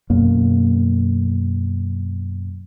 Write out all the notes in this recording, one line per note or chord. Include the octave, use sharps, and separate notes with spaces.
F#2 B2 A#3